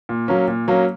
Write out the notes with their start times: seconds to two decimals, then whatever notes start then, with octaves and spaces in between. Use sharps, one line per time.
0.09 A#2
0.28 F#3 A#3 C#4
0.48 A#2
0.68 F#3 A#3 C#4